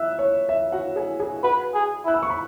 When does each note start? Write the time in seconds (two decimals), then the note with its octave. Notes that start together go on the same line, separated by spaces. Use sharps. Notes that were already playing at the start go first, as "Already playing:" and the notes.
Already playing: E5 E6 F#6
0.19 C#5
0.49 E5
0.72 F#4 F#5
0.96 G#4 G#5
1.20 G#4 G#5
1.43 F#4 B4 F#5
1.74 G#4
2.05 E4 F#6
2.14 E6
2.23 C#6
2.30 B5